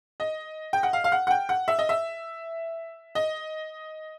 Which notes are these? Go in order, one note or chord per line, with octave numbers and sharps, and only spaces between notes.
D#5
G5
F#5
F5
F5
F#5
F#5
G5
F#5
E5
D#5
E5
D#5